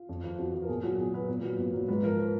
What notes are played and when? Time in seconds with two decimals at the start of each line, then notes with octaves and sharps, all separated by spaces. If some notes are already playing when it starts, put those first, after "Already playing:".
Already playing: F4
0.09 F2
0.24 F3
0.38 F2 F#4
0.53 F3
0.62 A#4
0.69 A#2 G#4
0.83 F#3 F#4
0.98 A#2 G#4
1.13 F#3 B4
1.29 A#2
1.43 F#3
1.58 A#2
1.74 F#3
1.88 G#2 B4
2.04 F3 A#4
2.18 A#4